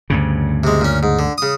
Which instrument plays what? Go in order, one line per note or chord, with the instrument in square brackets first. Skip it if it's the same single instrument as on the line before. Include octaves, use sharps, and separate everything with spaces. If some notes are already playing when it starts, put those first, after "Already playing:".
[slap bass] D2 G2 C#3
[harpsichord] C3 G#3
A#2 C#4
G#2
D3
C#3 D#6